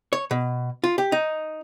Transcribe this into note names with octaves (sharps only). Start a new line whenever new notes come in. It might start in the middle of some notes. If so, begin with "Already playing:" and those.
C#5
B2
F4
G4
D#4